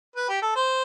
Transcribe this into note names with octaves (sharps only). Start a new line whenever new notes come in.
B4
G4
A4
C5